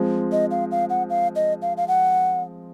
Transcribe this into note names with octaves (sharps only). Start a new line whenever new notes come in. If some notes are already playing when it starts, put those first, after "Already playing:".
Already playing: F3 G#3 C4
D#5
F5
F5
F#5
F5
D#5
F5
F5
F#5